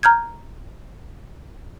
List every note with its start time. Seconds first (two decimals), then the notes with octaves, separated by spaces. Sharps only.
0.03 A#5 F6 G6 G#6